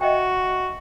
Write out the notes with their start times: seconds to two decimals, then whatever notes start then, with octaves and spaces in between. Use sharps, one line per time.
0.01 F#4 D#5 E5 G5